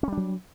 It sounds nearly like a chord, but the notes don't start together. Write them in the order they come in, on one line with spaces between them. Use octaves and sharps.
C#4 G3 D4 F#3